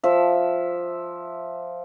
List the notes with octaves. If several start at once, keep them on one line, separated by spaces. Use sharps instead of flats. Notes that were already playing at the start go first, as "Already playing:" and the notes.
F3 E5